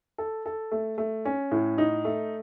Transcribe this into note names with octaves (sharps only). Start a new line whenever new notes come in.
A4
A4
A3
A3
C#4
A2
D#4
A3